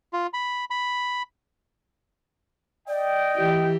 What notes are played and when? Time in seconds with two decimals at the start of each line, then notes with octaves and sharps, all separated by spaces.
0.13 F4
0.33 B5
0.70 B5
2.88 D5 D#5 G5
3.36 E3 G4